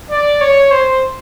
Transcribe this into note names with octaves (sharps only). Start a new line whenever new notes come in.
D5
C#5
C5